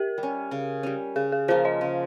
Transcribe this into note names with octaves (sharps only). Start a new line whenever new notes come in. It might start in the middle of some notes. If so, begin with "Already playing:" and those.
Already playing: G4 A#4
G3
C#4
C#3
G3 C#4
C#3 G#4
G#4
F3 A#3 F4 G#4 C5
C5 D#5
C#3